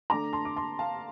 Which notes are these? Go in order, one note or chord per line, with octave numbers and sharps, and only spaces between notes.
D3 A3 D4 A#5 D6
A5 C6
D6
A5 C6
F5 A5